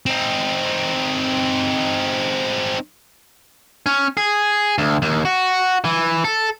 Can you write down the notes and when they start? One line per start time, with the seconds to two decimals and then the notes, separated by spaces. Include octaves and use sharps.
0.06 C4 D#4
3.86 C#4
4.17 G#4
4.78 D2
5.02 D#2
5.25 F#4
5.85 E3
6.24 A4